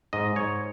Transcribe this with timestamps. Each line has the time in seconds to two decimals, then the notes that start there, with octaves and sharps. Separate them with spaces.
0.13 G#2 D#5
0.36 G#2 C#5